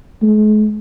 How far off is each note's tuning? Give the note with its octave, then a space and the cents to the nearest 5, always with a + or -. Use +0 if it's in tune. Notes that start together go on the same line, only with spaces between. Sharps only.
G#3 +45